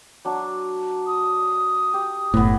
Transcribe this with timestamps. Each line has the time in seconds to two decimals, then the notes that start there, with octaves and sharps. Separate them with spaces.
0.25 F#3 D4
1.07 D#6
1.94 G4
2.34 F#1 A2 B3 B4